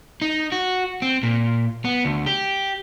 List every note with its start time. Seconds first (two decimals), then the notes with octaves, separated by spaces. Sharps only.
0.22 D#4
0.52 F#4
1.02 C4
1.23 A#2
1.85 B3
2.05 D2
2.26 G4